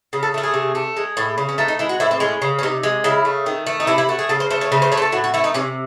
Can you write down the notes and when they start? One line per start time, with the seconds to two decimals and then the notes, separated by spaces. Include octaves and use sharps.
0.13 C#3
0.23 A4
0.34 A3 A4
0.43 G#4
0.54 C3
0.75 A3
0.97 G#3
1.17 A2
1.38 C#3
1.49 C#4
1.58 A3 D#4
1.68 D#4
1.79 G#3 E4
1.89 F#4
2.00 A2 E4
2.11 C4
2.20 G#3 C#4
2.42 C#3
2.59 C#4
2.63 C3 D#4
2.83 G#3
3.04 C#3 E4
3.25 A3
3.46 D#3
3.67 A3
3.80 D#4
3.87 C3 E4
3.98 E4
4.09 A3 F#4
4.19 G#4
4.29 C#3 A4
4.40 C5
4.50 A3 C5
4.61 C#5
4.72 C#3 C5
4.82 C5
4.92 A3 C#5
4.97 C5
5.02 A4
5.12 A2 F#4
5.24 F#4
5.34 A3 E4
5.44 D#4
5.54 C3 C#4